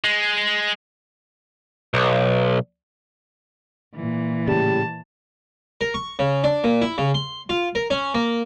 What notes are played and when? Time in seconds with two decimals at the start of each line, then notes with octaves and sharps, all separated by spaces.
0.04 G#3
1.94 B1
3.95 A#2 E3
4.48 A2 C#3 G3 A5
5.81 A#4
5.94 C#6
6.19 C#3
6.44 D4
6.64 A#2
6.82 E4
6.98 C#3
7.14 C6
7.49 F4
7.75 A#4
7.90 C#4
8.14 A#3